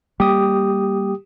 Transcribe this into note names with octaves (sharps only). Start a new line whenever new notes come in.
G3 A#3 G4 D#6